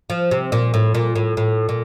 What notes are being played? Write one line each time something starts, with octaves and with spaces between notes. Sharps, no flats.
F3
C3
A#2
A2
A#2
A2
A2
A#2